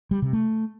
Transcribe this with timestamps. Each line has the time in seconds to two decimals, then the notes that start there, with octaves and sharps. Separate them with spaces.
0.11 G3
0.22 C3
0.33 A3